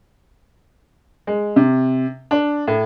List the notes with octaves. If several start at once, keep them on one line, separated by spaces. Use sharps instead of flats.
G#3
C3
D4
A2